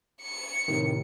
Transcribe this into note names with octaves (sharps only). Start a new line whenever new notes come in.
C#7
A2 C3 D#3